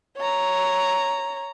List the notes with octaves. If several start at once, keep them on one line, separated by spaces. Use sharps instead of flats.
C#5 A#5